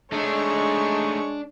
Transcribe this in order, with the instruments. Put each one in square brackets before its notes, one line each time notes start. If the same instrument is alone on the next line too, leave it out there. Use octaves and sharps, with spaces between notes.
[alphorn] G#3 [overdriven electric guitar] A3 D#4 [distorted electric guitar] D4 [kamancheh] C#5 C#6